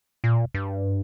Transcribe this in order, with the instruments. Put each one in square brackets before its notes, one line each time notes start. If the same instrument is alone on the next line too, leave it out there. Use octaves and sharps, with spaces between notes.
[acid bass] A#2
G2